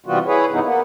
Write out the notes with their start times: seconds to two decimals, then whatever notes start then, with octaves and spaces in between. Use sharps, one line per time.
0.06 C3 E3 G3 B3 F4 F#4
0.26 E4 G#4 B4 C#5
0.52 G2 C3 E3 B3 D#4 E4
0.64 A#3 B3